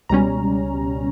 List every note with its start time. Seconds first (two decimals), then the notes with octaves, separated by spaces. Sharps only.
0.09 C#2 B2 G3 C#4 A#5